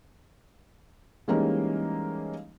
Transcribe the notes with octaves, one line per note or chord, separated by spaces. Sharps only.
E3 G3 G#3 A#3 C#4 D#4